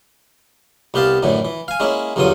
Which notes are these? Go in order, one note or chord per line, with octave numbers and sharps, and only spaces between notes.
C2 B3 G4 F5 A5
F#2 A2 D3 E3
E3
F5 G#5
G#3 A#3 C#4 E4
E2 G2 D3 F#3 F4 D#6